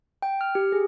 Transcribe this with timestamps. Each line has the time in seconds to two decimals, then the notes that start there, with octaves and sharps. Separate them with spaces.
0.22 G5
0.41 F6
0.55 G4
0.72 G#4